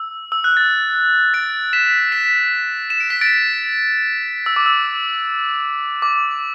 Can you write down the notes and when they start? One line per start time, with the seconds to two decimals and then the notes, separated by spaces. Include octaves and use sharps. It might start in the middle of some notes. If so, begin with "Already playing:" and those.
Already playing: E6
0.32 E6
0.44 F#6
0.57 A6
1.34 A6 D7
1.73 B6 E7
2.12 B6 E7
2.90 E7
3.00 D7
3.10 B6
3.21 A6 D7
4.46 E6
4.56 D6
4.66 E6
6.02 D6